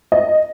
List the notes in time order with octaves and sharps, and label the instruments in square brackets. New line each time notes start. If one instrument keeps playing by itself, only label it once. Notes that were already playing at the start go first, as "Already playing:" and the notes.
[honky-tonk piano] D#5